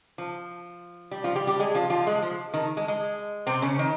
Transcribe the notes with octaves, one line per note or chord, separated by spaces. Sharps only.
F3
G3
F3 F4
G3 G4
G3 G4
G#3 G#4
F3 F4
F3 F4
G#3
F3
D#3
G#3
G#3
C3 C4
C#3 C#4
D#3 D#4